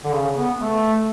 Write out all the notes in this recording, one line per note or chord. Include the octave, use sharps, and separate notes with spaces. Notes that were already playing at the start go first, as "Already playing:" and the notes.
D3
C#3
B3
A3